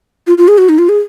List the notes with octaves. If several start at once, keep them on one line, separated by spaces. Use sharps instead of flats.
F4
F4
G#4
F#4
D#4
F4
G#4